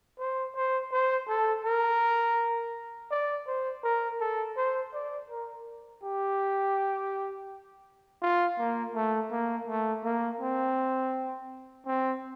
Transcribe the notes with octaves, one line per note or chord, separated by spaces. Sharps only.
C5
C5
C5
A4
A#4
D5
C5
A#4
A4
C5
D5
A#4
G4
F4
A#3
A3
A#3
A3
A#3
C4
C4